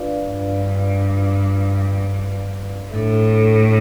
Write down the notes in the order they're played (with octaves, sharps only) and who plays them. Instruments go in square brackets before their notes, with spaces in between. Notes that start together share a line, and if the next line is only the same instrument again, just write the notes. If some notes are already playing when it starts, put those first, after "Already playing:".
Already playing: [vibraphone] D4 F4 B4 D5 F5
[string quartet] G2
[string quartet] A2 [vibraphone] D4 A4 E5